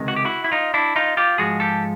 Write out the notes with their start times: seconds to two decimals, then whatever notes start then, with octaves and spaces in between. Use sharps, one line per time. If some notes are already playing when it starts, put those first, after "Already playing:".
Already playing: C#2 C3 D#3 G#3
0.08 F#4
0.16 G4
0.25 E4 F#4
0.44 E4
0.52 D#4 F4
0.74 D4 E4
0.96 D#4 F4
1.17 F4 G4
1.38 G#2 F3 G#3 F#4 G#4
1.60 G4 A4